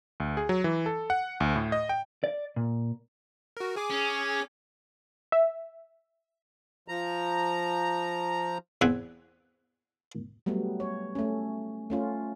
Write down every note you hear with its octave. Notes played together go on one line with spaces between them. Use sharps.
D2
G#4
F#3
E3
A4
F#5
D2
A2
D#5
G5
D5
A#2
F#4 A#4
G#4 G#5 D6
C#4
E5
F3 A#5
E2 C4 F#5 G#5
F#3 G3 A3 B3
C#5
A3 C#4
A3 C#4 F4